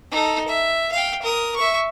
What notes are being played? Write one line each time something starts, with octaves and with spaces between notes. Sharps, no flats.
D#4 A4
E5
F5 G5
A#4 D#6
E5 C#6